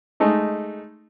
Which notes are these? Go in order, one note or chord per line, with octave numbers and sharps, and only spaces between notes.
G#3 A3 D#4